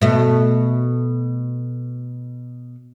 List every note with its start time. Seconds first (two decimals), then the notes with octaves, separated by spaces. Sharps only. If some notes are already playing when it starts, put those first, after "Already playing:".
0.02 B2 A3